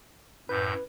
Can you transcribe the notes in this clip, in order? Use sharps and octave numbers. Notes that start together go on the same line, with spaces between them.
F#2 A2 B4 G6